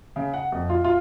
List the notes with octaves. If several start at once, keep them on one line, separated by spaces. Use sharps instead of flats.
C#3
F#5
F2
F4
F4